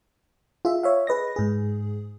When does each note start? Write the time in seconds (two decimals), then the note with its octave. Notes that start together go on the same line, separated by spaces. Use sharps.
0.65 F4 G#4 E5
0.83 C#5 E5 F5
1.07 G#4 B4 D#5 A#6
1.36 G#2 G#4